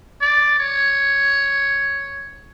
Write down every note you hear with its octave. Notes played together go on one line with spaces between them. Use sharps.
D5
C#5